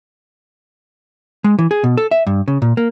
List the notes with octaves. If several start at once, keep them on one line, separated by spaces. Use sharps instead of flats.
G#3
E3
G#4
B2
A4
E5
G2
C#3
A#2
A#3